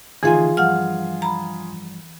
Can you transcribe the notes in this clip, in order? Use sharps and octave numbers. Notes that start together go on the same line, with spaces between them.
D2 D#3 E3 F4 G#4 G#5
G2 F3 F5 F#5 F6
A#5 B5